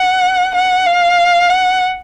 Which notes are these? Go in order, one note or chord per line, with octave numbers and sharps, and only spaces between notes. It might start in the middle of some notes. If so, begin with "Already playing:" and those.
Already playing: F#5
F#5
F5
F#5